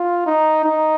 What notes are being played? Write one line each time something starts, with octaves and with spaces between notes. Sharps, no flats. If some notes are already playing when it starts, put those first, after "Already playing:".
Already playing: F4
D#4
D#4